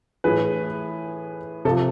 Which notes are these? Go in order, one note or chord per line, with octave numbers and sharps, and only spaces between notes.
A2 E3 G#4 B4
C3 F3 A4